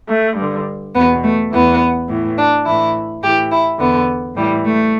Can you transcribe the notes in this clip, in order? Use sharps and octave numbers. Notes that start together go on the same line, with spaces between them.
A3
G2 D3
E2 B2 B3
A3
E2 E3 B3
A2 E3
D4
A2 E3 E4
A2 E3 G4
E4
E2 D3 B3
A2 E3 G3
A3